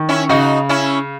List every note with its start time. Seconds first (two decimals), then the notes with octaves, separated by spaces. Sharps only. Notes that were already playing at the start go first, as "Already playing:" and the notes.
Already playing: D#3
0.09 C#4 E4
0.29 C#3 D#4 F#4
0.69 C#4 E4